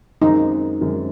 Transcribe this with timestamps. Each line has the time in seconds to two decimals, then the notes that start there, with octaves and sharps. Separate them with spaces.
0.22 F#2 D#3 G#3 C4 D#4
0.81 F#2 D#3 G#3 C4